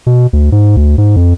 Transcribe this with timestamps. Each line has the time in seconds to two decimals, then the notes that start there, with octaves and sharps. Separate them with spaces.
0.06 B2
0.33 D2
0.52 G#2
0.77 D2
0.98 G#2
1.16 F2